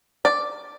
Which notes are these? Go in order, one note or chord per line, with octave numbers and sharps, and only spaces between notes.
D5